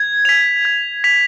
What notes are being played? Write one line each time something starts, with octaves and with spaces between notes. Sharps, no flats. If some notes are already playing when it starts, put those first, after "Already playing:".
Already playing: G#6
B6 F7
G#6
B6 F7